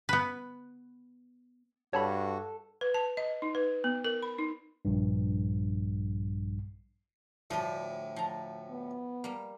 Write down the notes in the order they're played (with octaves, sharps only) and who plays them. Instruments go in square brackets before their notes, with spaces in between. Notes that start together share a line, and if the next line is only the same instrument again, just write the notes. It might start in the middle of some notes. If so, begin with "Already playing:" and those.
[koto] B3 B4
[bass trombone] G2 [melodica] F#4 [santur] A4 [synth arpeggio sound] C#5 A5 B5
[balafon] B4
A5
D#5
D#4
B4
B3
A#4
B5
D#4
[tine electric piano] A#1 G2
[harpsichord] D2 A2 D#6 [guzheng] F3 G3
[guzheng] F3 A#5
[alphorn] B3
[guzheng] G3 A#3